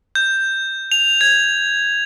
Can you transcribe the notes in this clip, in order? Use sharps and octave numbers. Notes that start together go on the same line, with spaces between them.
G6
F7
G#6